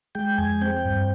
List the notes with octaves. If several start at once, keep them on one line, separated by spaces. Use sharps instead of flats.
G#3 G5
F2 G#5
C4 G5
G2